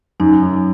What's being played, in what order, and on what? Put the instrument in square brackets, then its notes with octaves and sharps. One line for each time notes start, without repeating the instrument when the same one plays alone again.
[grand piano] F#2 [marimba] D#4
[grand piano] F#2